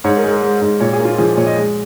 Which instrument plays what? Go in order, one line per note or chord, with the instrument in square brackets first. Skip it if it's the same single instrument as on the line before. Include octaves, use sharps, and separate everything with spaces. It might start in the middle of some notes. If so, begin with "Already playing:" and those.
[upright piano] G#2 C#5
A#4
G#3
A#4
G#3
G#2
A#2 C#5
G#4
A#3
F4
F3 G#4
A#2 C#5
D#5
G#3